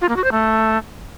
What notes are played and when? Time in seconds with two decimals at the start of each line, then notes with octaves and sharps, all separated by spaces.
0.01 F4
0.09 A#3
0.16 F#4
0.24 C5
0.31 A3